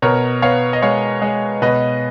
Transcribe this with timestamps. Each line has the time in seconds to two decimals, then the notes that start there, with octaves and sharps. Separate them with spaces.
0.02 B2 A#4 C#5
0.42 B3 C#5 F5
0.73 D#5
0.82 G#3 C#5 F5
1.22 G#3
1.62 B2 B4 D#5